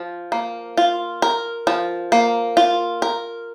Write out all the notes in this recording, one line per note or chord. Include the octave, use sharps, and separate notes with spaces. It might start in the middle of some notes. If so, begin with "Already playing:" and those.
Already playing: F3
A#3
F4
A#4
F3
A#3
F4
A#4